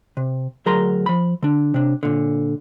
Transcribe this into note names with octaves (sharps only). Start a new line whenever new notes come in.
C3
D2 F#3 G#4 A#4 A#5 C6
F3 B5
D3 D4
C3 D4
A#2 D3